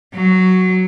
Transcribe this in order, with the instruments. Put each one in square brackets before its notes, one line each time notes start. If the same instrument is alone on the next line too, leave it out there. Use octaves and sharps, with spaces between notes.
[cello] F#3